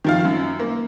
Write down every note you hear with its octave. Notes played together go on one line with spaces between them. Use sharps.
D#3 F3 F5
F#2
A#3